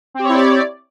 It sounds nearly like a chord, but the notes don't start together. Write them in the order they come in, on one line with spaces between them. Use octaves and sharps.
C4 G4 C#5 E4 D5